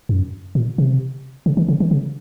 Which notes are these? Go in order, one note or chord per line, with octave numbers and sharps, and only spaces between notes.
F#2
A#2
C3
C#3
D#3
C#3
D#3
C#3